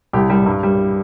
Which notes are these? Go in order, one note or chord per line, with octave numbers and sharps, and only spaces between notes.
C2 G4
G3
G2
G3